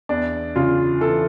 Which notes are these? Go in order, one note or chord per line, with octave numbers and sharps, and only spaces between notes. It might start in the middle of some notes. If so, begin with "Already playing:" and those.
E2 D4
C#3 F4
E3 A4